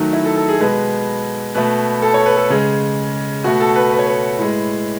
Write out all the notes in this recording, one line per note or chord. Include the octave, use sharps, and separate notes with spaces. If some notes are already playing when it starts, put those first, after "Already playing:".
Already playing: D#3 F#3 A3 D#4
E4
A4
A4
G#4
B2 G#3 B4
B2 A3 B4
A4
C#5
B4
A4
C#3 G#3
B2 A3 F#4
A4
B4
B4
C#5
B4
A2 G#3